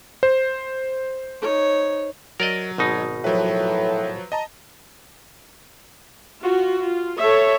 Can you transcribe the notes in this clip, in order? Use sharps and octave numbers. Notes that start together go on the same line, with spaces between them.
C5
D#4 C#5
F#3 A#4 D5 D#5
G#1 B2 D#4
A2 F3 F#3 B4
D#5 A5 A#5
F4 F#4
F4
A4 C#5 E5